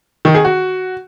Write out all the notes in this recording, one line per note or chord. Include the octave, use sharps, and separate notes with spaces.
D#3
G#4
F#4